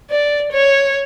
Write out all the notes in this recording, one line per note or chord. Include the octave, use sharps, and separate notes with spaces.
D5
C#5